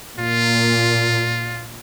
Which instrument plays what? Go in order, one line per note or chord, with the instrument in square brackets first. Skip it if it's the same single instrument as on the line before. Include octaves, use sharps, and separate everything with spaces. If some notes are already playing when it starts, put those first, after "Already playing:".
[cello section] A#2 [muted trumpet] F4